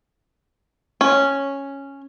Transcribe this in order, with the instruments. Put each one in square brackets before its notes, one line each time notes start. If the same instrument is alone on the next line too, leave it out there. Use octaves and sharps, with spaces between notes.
[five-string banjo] C#4